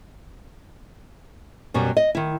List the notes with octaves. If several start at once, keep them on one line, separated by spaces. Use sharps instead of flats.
F#2 B2 F#3 G3
D#5
D#3 E4